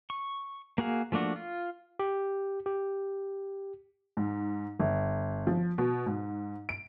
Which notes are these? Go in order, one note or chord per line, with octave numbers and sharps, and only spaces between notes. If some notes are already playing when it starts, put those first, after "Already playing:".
C#6
A#3 F#4 G#4 F5
F3 A3 A#3 D4 F#4
F4
G4
G4
G#2
G1
F3
B2
G#2
D7